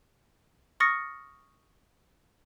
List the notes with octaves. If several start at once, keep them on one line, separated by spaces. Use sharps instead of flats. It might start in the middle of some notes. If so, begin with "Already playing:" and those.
C#6 D#6 F6 A6 A#6 C#7